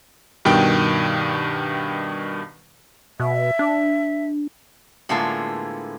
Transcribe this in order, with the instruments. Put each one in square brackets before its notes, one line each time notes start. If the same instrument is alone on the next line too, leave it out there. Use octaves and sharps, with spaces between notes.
[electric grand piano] G2 B2 D#3 G5
[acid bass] B2 [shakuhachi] E5
[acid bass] D4
[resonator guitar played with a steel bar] A2 D3 G#3 A#3 B3 F4